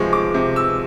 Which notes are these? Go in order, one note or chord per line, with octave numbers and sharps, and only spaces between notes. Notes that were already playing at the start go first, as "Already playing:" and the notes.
Already playing: C3 F3 G#3 C#6
D6
C3
E6